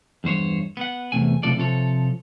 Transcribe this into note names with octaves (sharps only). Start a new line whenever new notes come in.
E2 G2 C5 C#5
B3 F#5
E2 C3 A3 G#5
C#2 A2 C3 F3 A4 D5
C3 F3 A4 C#5